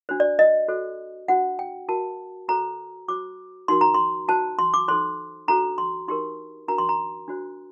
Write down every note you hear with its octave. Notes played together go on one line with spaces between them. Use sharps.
D4 F#4 C5
D5
D#5
F#4 A4 C5
D4 F#4 C5 F#5
G5
F#4 A#4 A5
F#4 A4 C5 A#5
F#4 C5 D6
D#4 F#4 A#4 C6
A#5
C6
F#4 C5 A5
C6
D6
D#4 A4 C5 C6
D4 F#4 A4 C5 A#5
C6
D#4 G4 A#4 C6
D4 F#4 A#4 A#5
C6
A#5
D4 F#4 C5